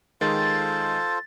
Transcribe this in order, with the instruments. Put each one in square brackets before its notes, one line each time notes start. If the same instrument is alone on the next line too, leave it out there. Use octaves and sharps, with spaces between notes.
[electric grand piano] D#3 G#3 [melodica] F4 A4 C5 [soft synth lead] A6